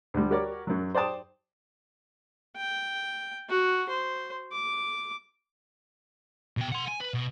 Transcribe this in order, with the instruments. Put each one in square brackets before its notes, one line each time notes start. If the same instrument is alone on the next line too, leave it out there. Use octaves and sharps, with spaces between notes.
[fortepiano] D2 G3
F#4 G4 A#4 C#5 D5
F#2 F#3
C5 D5 G5 A5 D#6
[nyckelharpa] G5
F#4
C5
D6
[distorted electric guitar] B2 G5
F#5 C6
G#5
B4
B2